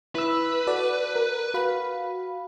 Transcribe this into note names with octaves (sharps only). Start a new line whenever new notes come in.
E4 B4 E6
F#4 A4 D5
A#4
F#4 F5 B5